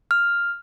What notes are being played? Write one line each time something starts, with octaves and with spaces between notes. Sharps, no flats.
F6